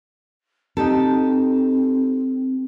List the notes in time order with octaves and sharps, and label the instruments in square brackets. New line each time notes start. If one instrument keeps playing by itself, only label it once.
[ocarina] C4 [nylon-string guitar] D#4 G4 A4